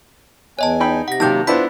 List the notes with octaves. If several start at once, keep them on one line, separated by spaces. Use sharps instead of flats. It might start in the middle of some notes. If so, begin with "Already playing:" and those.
E2 C#5 D#5 G#5 A5
D#4 G5 B5
C3 F#5 A#6
C3 D#3 F#3 A#3 G4 A5 G6
B3 D4 E4 F4 C5 B5 B6